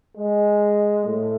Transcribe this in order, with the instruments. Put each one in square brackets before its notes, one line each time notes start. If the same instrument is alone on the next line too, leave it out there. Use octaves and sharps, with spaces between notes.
[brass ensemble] G#3
A2 A3